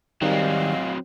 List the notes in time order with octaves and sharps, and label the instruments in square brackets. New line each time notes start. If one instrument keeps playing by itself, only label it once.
[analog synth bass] D#3 [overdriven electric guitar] F#3 C4 [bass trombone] G3 [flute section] D#5 F5 G#5